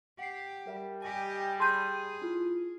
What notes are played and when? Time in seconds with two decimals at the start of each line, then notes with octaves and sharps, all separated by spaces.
0.19 G4 F#5 C7
0.67 G3 A#4 E5
1.02 G4 D#5 G#5
1.60 G#4 A5 B5 C6 G6 D#7
2.22 E4 F4